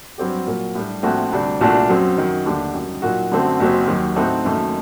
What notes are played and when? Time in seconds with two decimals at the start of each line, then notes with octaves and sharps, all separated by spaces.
0.18 G2 F#3 C4 G4
0.46 A#2 F#3 A#3
0.75 A2 G3 D4
1.03 A#1 A2 A3 C4 F#4
1.32 D2 C3 G3 D4
1.61 C2 A#2 A3 D4 F#4
1.89 F#2 F#3 C4
2.17 F#2 D#3 F#3
2.45 D#2 D3 A3 D4 G4
2.73 F#2 D#3 G3
3.02 A#2 F#3 A#3 D#4 F#4
3.31 F#2 D3 F#3 A3 C4
3.60 F#1 F#2 F#3 C4
3.87 D#2 D#3 F#3
4.16 A2 A3 C4 D#4 F#4
4.44 F#1 F#2 D#3 A3